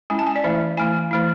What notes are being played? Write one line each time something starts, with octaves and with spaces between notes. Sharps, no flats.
G#3 C#4 E4 G#5
A5
G#5
D5
E3 A3 E4 E5
E3 A3 E4 G#5
E3 A3 E4